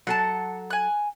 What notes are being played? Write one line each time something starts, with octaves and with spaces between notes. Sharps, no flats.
F#3 A4 F#5 A5
G#5 F#6